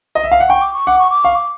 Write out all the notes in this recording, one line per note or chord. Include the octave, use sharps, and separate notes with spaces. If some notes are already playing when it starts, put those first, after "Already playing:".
D#5
E5
F5
F#5
G5 C#6
D6
C#6
F#5 D6
C#6
D6
F5 C#6
D6